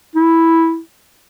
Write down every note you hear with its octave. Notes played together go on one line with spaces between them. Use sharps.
E4